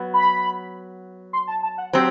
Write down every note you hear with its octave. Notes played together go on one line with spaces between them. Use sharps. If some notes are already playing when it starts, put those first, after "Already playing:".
Already playing: F#3 B3
B5
C6
A5
A5
F#5
F#3 C4 G4 C5